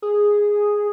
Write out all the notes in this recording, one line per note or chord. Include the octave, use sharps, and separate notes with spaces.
G#4